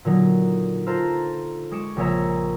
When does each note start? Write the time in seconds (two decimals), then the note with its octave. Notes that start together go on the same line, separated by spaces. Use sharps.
0.05 A#2 D3 F#3 D#4
0.86 F4 A4 C5 A5 A#5
1.71 G#3 G#4 C#6 D6 C#7 E7
1.96 A#1 C#3 G#4 C#5 E5 A#5